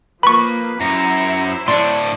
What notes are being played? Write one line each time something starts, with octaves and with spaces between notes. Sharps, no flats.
F3 A#3 B4 B5 C#6
F#2 E4 C5 A#5
A2 D4 D5 C6